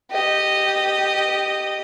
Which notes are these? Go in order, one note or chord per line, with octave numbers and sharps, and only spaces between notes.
G4 D#5